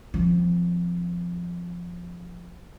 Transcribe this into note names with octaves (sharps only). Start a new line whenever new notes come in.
F3 C4